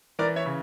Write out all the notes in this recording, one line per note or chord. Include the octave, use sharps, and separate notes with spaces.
E3 A#4 D5
C#5 E5
C#3